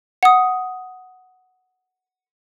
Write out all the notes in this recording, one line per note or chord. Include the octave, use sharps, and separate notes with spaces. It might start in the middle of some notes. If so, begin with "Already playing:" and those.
F#5 D#6